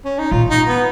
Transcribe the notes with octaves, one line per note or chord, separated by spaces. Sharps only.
C#4
D#4
A#2 F4
D#4
B3